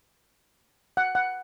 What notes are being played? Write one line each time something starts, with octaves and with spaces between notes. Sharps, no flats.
F#5
F#5